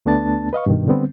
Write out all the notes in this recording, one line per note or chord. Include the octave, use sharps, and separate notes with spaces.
D2 A3 B3 D4 A5 A6
B4 D#5 F5 C#6
G2 B2 D#3
D3 G3 B3 C4